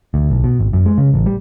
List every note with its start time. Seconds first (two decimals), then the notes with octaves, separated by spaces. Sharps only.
0.14 D2
0.30 B1
0.44 B2
0.59 G#1
0.73 F#2
0.86 G#3
0.98 C#3
1.14 A1
1.26 G3